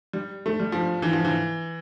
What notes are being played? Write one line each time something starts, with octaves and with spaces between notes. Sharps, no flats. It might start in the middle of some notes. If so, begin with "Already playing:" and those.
G3
A3
G3
F3
E3
F3
E3